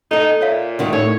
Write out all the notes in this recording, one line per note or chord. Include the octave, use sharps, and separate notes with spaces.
D#4 A4 D#5
A#2 C#5 E5 F5
D2 D#3 G3
A2 D#4 A#4 C#5 D5